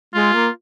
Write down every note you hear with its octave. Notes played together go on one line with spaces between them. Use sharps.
G#3 F4
A#3